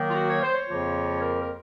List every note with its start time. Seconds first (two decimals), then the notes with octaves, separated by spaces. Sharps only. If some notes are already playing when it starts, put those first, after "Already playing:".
Already playing: D#3 F#3 A#3
0.10 F4
0.15 F#4
0.29 C#5
0.43 C5
0.55 C#5
0.68 F2 C#3 F3 A#3 F4
1.21 A#4
1.42 A#4